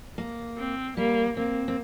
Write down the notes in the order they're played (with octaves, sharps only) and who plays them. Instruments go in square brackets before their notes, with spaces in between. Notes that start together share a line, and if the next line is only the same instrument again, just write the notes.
[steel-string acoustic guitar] A#3
[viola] C4
[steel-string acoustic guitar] G3 [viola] A#3
[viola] A#3 [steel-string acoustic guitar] C4
[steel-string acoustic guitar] C4